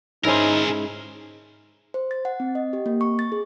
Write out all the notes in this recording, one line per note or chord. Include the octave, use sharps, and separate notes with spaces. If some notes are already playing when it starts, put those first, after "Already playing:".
G#2 C#4 D#4 E4 G#4 A#4
C5
A6
F#5
C4
D#5
G4
A#3
C#6
A6
G#4